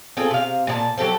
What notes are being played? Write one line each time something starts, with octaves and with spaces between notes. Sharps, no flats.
C4 F4 G#4 A4
C3 F5
A#2 G#4 A5
F#3 G4 A4 C5